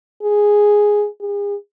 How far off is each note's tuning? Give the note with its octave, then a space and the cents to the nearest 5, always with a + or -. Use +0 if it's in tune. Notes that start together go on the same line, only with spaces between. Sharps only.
G#4 +0
G#4 -40